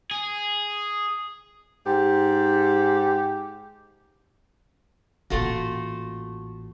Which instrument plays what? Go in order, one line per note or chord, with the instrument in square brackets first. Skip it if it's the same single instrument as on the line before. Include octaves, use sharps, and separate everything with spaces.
[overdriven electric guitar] G#4
[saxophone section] G#2 G4
[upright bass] A1 A#2 [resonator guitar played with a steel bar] A3 F4 F#4